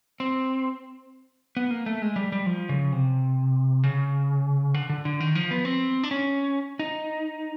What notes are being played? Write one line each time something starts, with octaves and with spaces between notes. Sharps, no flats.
C4
B3
A#3
A3
G#3
G3
G3
F3
C#3
C3
C#3
D3
D3
D3
D#3
F3
B3
C4
D4
C#4
D#4